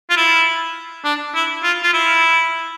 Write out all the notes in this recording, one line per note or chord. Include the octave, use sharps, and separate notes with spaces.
F4
E4
D4
E4
F4
F4
E4